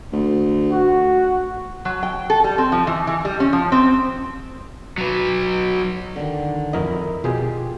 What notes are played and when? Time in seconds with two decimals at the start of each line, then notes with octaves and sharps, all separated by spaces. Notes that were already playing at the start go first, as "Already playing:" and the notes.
0.12 D2
0.72 F#4
1.85 F#3
2.03 G5
2.30 A4
2.44 G3
2.58 C4
2.72 F3
2.87 E3
3.07 E3
3.25 G3
3.40 C#4
3.53 F3
3.72 C4
4.98 F#3 B4
6.16 D3 D#3
6.73 F2 E4 A#4 D#5
7.24 B2 F4 G4 G#4